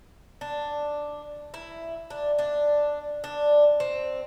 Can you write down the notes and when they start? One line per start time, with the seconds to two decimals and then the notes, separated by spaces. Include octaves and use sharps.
0.41 D4
1.54 E4
2.10 D4
2.39 D4
3.24 D4
3.80 C4